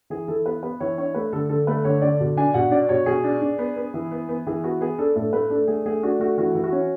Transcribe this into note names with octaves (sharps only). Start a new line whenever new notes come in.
E3 G#4
E3 A4
B3 B4
B3 B4
E3 C#5
D4 C#5
A3 B4
D3 A4
D3 A4
A3 B4
D3 C#5
D3 D5
B2
D4 G#5
B2 F#5
D4 D5
B2 C#5
B2 G#4
D4
D4
B3
B3
E3
B3
B3
E3 G#4
B3 F#4
B3 G#4
D4 A4
A2 A4
A3 B4
D4 A4
A3 G#4
A3 G#4
D4 F#4
A3 F#4
E3 F#4
E3
F#4
C#4